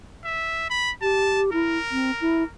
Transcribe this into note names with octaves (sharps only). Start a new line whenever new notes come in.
E5
B5
G4 A5
E4 A#4
C4
E4